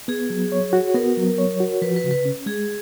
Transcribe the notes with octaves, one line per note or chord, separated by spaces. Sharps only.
B3 G#4
F#3
C#5
F#4
B3 A#4
F#3
C#5
F#4
F3 B4
B4
C#3
B4
C#4
G#3 G#4